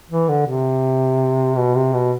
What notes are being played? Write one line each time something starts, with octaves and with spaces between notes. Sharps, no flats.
E3
D3
C3
B2
C3
B2